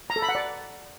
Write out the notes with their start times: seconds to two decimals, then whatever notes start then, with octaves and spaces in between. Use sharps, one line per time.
0.10 A#5
0.16 A4
0.22 B5
0.29 F#5
0.35 D5